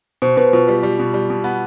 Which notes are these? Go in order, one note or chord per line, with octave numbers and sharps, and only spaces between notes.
B2 C5
B2 B4
B2 F4
G3 F4
G3
B2
G3
B2
B3